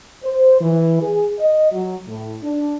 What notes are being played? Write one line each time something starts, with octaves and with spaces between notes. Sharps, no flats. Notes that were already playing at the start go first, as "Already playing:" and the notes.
C5
E3
G#4
D#5
F#3
A2
D4